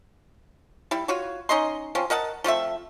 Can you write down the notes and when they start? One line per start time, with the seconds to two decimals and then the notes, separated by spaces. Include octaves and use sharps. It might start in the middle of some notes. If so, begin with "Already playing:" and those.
0.91 G3 E4
1.08 F4 F#4 C#5
1.49 C#4 D#4 D#5 C6
1.95 F3 C4 C#4
2.10 A#4 D#5 F#5 A5
2.44 F3 A3 C4 E5